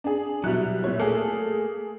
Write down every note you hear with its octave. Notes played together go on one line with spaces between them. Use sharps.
D4 G#4
B2 F#3 G3 E4 F#6
A#2 E4 C#5
A3 A#3 G#4 A4